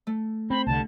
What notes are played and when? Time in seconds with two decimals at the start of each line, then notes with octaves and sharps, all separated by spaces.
0.07 A3
0.50 C4 B5
0.67 C2 D3 A5